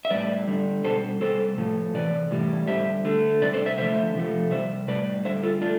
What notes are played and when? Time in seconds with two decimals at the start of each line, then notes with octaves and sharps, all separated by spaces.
0.05 E5
0.10 A2 G3 B4 D5
0.48 D3 G3
0.84 B2 G3 A4 C5
1.21 C3 G3 A4 C5
1.58 A2 F3 A3
1.94 C3 E3 B4 D5
2.31 A2 E3 G3
2.67 D3 G3 C5 E5
3.05 D3 A3
3.41 C3 G3 B4 D5
3.53 A4 C5
3.66 C5 E5
3.78 D3 F3 A3 C5 E5
4.15 C3 F3 A3
4.51 C3 G3 C5 E5
4.88 A2 G3 B4 D5
5.25 D3 C5 E5
5.29 G3
5.43 F4 A4
5.62 A3 D4 F4